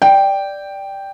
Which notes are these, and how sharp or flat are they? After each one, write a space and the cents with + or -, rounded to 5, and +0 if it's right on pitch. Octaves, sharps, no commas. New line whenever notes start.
D5 +0 G5 +0